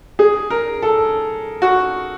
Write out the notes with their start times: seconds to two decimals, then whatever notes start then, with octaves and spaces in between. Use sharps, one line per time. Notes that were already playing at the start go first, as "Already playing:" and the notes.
0.19 G#4
0.50 A#4
0.82 A4
1.62 F#4